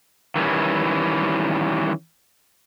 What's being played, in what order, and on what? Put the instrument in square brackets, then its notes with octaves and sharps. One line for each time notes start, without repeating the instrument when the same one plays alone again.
[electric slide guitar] D#3 E3 G3 C#4